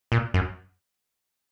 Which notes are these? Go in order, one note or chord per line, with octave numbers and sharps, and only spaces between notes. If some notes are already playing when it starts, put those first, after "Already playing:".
A#2
F#2